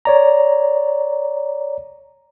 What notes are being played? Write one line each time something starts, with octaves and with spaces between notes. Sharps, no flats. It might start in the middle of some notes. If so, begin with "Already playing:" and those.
C#5 D5 A#5